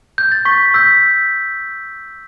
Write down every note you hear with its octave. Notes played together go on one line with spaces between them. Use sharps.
G6
A6
C#6 B6
E6 G6 B6